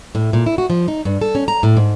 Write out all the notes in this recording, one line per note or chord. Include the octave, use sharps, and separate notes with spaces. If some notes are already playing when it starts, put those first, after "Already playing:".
A2
A#2
E4
F#4
F3
D#4
G2
A4
C#4
A#5
A2
G#2